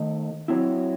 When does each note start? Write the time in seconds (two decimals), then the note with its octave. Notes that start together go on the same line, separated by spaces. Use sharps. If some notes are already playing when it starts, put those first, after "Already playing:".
Already playing: D#3 A3 D#4
0.48 F#3 C4 E4